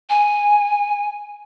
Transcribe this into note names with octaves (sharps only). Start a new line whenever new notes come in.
G#5